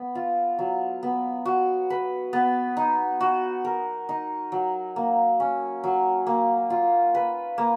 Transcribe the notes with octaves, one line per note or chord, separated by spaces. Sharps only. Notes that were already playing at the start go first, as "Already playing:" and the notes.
Already playing: B3
F4
F#3
B3
F#4
B4
B3
D#4
F#4
A#4
D#4
F#3
A#3
C#4
F#3
A#3
F4
B4
A#3